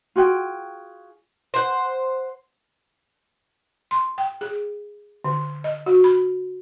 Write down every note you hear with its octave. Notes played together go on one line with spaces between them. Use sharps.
F4 F#4 G#4 G5
C5 F#5
C6
G5
G#4
D3
D#5
F#4
B5